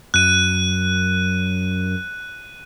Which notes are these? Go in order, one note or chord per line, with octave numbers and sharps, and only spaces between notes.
F#2 F#6 D#7